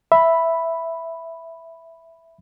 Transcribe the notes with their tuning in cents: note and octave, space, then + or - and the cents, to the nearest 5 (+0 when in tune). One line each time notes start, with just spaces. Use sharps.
E5 +0 B5 +0